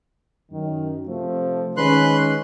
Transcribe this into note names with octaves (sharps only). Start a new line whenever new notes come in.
F#2 D#3
C3 F3 A3
D#3 G#3 C#4 B4 C6 F#6